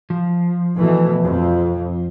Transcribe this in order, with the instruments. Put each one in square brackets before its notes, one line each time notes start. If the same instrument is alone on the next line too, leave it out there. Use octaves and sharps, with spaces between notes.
[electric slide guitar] F3
[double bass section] B2 E3 A3
F2